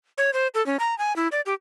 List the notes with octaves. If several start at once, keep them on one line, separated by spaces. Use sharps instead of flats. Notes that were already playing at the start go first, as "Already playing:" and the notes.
C#5
C5
A4
C#4
A#5
G#5
E4
D5
G4